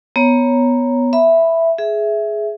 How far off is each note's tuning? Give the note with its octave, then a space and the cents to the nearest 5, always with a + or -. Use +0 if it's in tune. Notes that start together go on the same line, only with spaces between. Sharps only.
B3 +0 C#5 +0 A#5 +0
E5 +0 B5 +0
G#4 +15 E5 +0